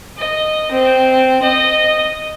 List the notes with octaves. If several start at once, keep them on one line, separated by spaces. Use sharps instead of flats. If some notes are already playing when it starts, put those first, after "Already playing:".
D#5
C4
D#5